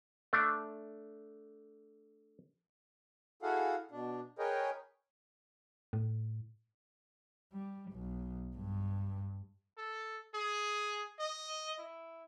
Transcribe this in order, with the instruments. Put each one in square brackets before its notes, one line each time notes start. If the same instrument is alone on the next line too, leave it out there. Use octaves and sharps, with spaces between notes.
[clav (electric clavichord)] A3 D4
[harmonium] E4 F#4 G#4 A4 F5 F#5
B2 D4
G#4 A#4 B4 C#5 D#5 G5
[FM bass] A2
[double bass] G3
B1
G2
[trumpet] A4
G#4
D#5
E4